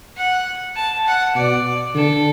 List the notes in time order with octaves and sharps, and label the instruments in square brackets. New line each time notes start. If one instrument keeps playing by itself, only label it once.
[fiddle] F#5
A5
F#5
[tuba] B2 [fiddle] D5
[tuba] D3 [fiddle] A4